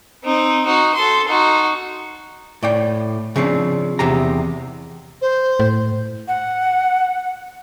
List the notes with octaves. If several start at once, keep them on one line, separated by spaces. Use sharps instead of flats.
C4 D#4
D#4 F#4
A4 C6
D#4 F#4
A2 D5 G5
C#3 F3 C4 D4
E2 C3 G4 A#5
C5
A2
F#5